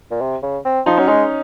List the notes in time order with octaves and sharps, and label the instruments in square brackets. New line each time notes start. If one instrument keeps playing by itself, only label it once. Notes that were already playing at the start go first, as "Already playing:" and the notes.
[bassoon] A#2
C3
C#3
C4
[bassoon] F3 [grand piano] D#4
[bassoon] F#3 [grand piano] C#4
[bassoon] G#3 [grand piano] D#4